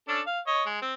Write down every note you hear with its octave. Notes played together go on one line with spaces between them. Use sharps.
C#4 D4 A4
F5
C#5 D#5
G#3
C4